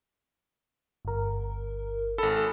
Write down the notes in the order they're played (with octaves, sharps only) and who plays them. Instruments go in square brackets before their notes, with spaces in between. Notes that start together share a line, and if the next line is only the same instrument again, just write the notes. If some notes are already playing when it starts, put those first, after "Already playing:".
[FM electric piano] G1 A#4
[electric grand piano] G#1 A4 [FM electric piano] B5